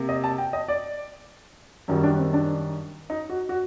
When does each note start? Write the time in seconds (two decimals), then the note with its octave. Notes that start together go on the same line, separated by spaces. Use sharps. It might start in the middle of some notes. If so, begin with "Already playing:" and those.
Already playing: C3 A#3
0.09 D#5
0.24 A5
0.38 G5
0.53 D#5
0.68 D5
1.88 F#2 D#3 G3 D#4
2.03 D4
2.18 C4
2.33 D4
3.10 D#4
3.30 F#4
3.49 F#4